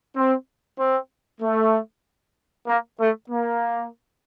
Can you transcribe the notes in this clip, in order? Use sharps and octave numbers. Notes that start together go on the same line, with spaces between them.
C4
C4
A3
A#3
A3
A#3